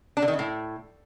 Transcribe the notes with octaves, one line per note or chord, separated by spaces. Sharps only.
D4
D3
D#3
C#3
A2